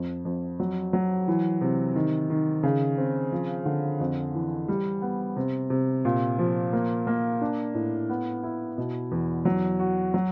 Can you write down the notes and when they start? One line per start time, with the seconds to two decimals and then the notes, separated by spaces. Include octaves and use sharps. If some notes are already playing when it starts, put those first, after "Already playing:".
Already playing: F2
0.25 F2
0.60 F#3
0.93 F#3
1.28 E3
1.61 C3
1.95 D#3
2.30 D#3
2.63 C#3
2.98 C4
3.32 F3
3.66 D3
4.00 F2
4.35 E3
4.68 G3
5.02 B3
5.36 C3
5.70 C3
6.05 A#2
6.39 F3
6.73 A#3
7.07 A#3
7.41 D4
7.75 A2
8.10 B3
8.43 E4
8.78 B2
9.11 E2
9.45 F#3
9.79 F#4
10.14 F#3